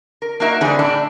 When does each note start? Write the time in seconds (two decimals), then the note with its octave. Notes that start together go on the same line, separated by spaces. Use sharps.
0.22 A#4
0.40 A#3 D#4 F#4 A#4 E5
0.61 D3 E3 G3 C4 G#4
0.79 A2 D4 E4 D5